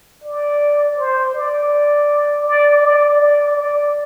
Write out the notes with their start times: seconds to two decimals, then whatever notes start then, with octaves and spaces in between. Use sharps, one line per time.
0.24 D5
0.98 C5
1.35 D5
2.46 D5
2.83 D5
3.21 D5
3.57 D5